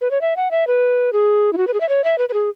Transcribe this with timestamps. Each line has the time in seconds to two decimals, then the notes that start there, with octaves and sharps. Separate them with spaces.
0.01 B4
0.11 C#5
0.21 E5
0.36 F#5
0.51 E5
0.67 B4
1.13 G#4
1.53 E4
1.57 F#4
1.67 B4
1.74 G#4
1.81 E5
1.89 C#5
2.04 E5
2.18 B4
2.29 B4
2.34 G#4